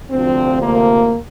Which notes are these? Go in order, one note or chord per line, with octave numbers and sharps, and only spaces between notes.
D2 C3 F3 C4
A#3